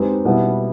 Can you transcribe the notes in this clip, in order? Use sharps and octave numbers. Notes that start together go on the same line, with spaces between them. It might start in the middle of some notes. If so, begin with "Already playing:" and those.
Already playing: G#3 C4 D#4 G4 B4
B2 G3 B3 E4